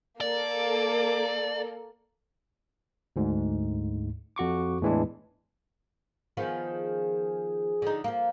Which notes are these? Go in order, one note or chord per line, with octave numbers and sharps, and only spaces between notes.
A#3 A4 D5
D2 G#2
F2 F#4 C#6 D6
E2 A2 E3 G#3 D4
D#3 F3 B3 G#4
D3 D#4
F3 A#3